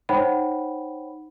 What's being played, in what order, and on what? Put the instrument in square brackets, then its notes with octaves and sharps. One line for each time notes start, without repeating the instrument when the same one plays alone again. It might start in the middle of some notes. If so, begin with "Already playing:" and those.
[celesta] D#4 C5 C#5 F#5 G5 B5